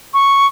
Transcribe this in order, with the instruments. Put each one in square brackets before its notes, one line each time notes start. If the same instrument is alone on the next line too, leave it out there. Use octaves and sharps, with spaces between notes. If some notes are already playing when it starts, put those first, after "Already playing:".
[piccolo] C#6